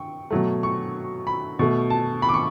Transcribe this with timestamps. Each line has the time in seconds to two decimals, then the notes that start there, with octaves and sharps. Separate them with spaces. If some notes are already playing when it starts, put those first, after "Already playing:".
Already playing: G5 C#6
0.31 B2 F#3 A3
0.63 C#6
1.27 B5
1.59 B2 A3
1.90 A5
2.22 B5
2.29 D6
2.34 C#6